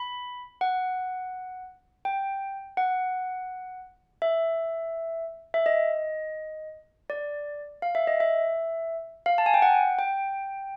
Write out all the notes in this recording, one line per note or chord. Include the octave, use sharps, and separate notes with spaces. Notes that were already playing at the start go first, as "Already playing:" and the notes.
Already playing: B5
F#5
G5
F#5
E5
E5
D#5
D5
F5
E5
D#5
E5
F5
A5
G#5
G5
F#5
G5